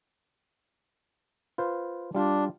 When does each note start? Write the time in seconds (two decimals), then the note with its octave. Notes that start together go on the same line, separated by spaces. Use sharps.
1.58 F4 B4 C5
2.15 G3 D4 F4 G4